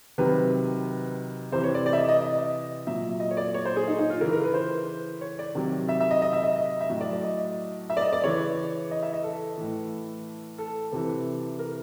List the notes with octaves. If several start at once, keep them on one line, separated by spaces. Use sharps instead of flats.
C3 D#3 F#3 B4
C3 E3 C5
C#5
D5
D5
E5
D#5
D#5
D#5
A#2 F#3 E5
D#5
C#5
D5
C#5
C5
G#4
D#4
D#4
F4
C#3 E3 A#4
A#4
B4
C5
C#5
D5
C3 D#3 F#3
E5
E5
D#5
D#5
E5
D#5
D#5
E5
A2 F#3 D#5
D5
D5
D#5
E5
D5
D#5
D5
C#3 E3 C#5
D#5
E5
D#5
A4
A2 E3
A4
C3 E3
A#4